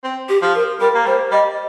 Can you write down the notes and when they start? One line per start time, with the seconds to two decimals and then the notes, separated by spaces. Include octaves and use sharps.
0.04 C4
0.29 G4
0.42 F3
0.55 A#4
0.80 G3 A#4
0.95 A#3
1.06 G3 C5
1.31 G3 D#5